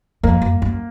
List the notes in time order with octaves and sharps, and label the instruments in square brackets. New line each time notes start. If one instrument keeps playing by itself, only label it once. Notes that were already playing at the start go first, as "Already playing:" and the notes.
[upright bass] F2 [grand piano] A#3
[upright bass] F#2
F#2